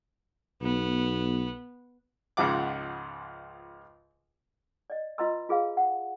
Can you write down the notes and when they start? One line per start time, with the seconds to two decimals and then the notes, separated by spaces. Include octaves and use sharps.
0.62 B1 B3
2.37 C#2 G#2 C#3 F3 F#5 D6
4.90 D5 D#5
5.18 F4 B4 D#5 A#5 C6 E6
5.49 F4 G#4 B4 F5
5.77 F#5